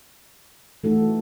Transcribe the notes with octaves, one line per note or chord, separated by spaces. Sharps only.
E3 A3 D#4 F#4 A4